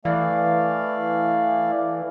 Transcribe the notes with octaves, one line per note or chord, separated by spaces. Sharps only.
E3 A3 D5 F5